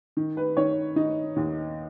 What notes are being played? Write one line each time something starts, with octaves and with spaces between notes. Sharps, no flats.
D#3
B4
D#3 C#5
D#3 D#4
D#2